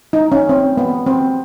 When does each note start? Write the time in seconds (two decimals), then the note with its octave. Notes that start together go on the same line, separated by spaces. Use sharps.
0.13 D#4
0.32 C#4
0.49 C4
0.77 B3
1.06 C4